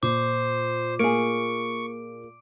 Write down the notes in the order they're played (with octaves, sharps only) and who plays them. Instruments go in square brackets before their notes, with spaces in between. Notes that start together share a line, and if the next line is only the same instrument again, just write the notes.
[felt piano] A#2 [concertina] C5 [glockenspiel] D6
[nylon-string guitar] A#3 G#4 [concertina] C#6 [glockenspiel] D7